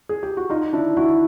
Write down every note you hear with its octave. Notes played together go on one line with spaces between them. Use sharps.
G#4
G4
F#4
D#4 F4
D4 E4
E4 F#4